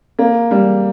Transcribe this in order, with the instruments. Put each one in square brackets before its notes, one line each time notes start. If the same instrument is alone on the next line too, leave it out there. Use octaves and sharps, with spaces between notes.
[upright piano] A#3
G3